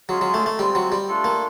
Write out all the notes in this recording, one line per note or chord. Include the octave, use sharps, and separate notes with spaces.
F#3 G#3 C#4 F4 G#4
F#3
A3
A3
G3 G#3 C4 F4
F#3
G3
A3 D4 F4 A4
A#3